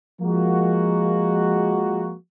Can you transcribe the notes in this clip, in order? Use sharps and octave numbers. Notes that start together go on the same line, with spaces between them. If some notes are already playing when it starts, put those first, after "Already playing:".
F3 G#3 A#3 F#4